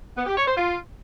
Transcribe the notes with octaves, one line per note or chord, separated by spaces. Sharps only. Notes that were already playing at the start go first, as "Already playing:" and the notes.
B3
G4
C#5
C5
F4